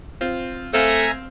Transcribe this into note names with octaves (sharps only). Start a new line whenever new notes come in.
C4 F4
A3 C4 E5 F5 G#5 A#5